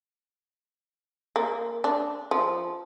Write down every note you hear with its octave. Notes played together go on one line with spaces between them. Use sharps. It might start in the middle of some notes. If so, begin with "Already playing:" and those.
A#3
D4
F3